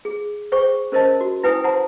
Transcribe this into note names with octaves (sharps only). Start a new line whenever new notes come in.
G#4
G#4 C5 G5 C#6
C#4 A#4 C5 D#5 A5
F#4
E4 B4 G5 G#5 D#6
C5 F#5 A5 A#5 C6